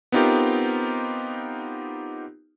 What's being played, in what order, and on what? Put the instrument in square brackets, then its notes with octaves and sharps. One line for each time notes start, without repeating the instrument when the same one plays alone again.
[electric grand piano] B3 C4 D#4 F4 G4 A#4